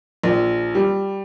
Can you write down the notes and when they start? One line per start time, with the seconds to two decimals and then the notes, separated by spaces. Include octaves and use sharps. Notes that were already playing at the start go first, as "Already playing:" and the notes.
0.24 A#1
0.75 G3